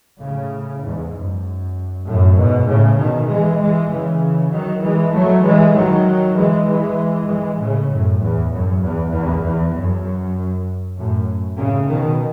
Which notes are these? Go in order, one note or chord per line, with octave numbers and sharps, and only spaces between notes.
A2 C#3
E2 G#2
F#2
F#2 A2
G#2 B2
A2 C#3
B2 D#3
E3 G#3
E3 G#3
C#3 E3
D#3 F#3
E3 G#3
F#3 A3
E3 G#3
D#3 F#3
E3 G#3
E3 G#3
E3 G#3
A2 C#3
F#2 A2
E2
F#2
E2
E2
E2
F#2
F#2 A2
A2 C#3
B2 D#3